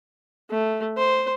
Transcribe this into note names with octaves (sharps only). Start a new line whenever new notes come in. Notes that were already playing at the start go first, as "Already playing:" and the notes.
A3
C5